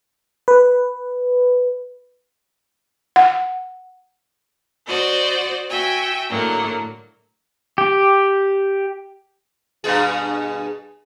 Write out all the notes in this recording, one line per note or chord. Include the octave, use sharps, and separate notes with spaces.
B4
F#5
F#4 C5 D5 D#5
F#4 E5 G5 G#5
A2 D3 F#3 A#3
G4
G2 B2 G#4